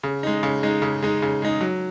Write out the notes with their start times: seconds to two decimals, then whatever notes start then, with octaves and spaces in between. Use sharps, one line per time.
0.03 C#3
0.23 G#3 D#4
0.43 C#3
0.63 G#3 D#4
0.82 C#3
1.02 G#3 D#4
1.22 C#3
1.42 G#3 D#4
1.61 F#3